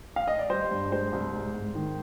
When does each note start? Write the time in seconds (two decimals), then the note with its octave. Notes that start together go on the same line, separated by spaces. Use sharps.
0.16 F5
0.28 D#5
0.39 D5
0.50 G3 C5
0.71 G2
0.92 G#3 C5
1.13 C2
1.33 G#2
1.54 G#2
1.75 D#3